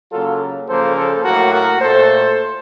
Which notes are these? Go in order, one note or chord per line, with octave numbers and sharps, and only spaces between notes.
C#3 F#3 A#3 F4 A4
C#3 F3 A#3 A4 C5
A4 C5
A2 F#3 A#3 F#4 A#4
F#4 A#4
A#2 A3 A4 C5